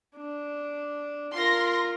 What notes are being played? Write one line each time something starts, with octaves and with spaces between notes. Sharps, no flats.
D4
F4 A#4 C6 A#6